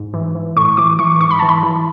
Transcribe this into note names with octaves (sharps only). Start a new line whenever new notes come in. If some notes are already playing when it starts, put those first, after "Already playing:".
Already playing: G#2
E3
E3
A2 C#6
E3 D6
E3 C#6
G#2 C#6
B5
E3 A5
B5
E3